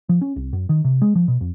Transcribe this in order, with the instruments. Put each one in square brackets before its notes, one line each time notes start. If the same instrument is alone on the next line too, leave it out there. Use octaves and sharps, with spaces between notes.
[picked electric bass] F3
C#4
C2
F#2
D#3
C3
G#3
F3
B2
F2